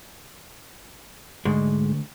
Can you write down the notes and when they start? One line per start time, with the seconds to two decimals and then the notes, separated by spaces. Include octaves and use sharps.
1.45 G#2 D3 G#3 A3